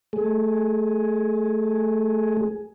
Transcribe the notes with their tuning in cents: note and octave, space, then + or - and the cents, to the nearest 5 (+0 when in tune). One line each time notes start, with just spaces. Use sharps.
A3 +0 G#4 +5